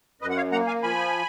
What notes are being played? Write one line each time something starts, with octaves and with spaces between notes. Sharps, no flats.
F#2 B4 D#5
F#5
C#5 F5
A#3 F#5 A#5
F5 G#5
F3 G#5 B5